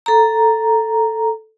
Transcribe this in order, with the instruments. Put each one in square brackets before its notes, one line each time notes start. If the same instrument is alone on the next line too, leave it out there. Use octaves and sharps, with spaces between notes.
[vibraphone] A4 A#5